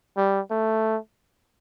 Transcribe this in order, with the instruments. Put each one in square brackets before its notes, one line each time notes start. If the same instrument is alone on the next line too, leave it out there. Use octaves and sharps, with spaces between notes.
[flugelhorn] G3
A3